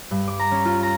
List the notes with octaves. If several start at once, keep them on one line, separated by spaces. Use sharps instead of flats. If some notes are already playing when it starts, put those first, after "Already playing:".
G2
D6
A#5
C#4
F4
A#5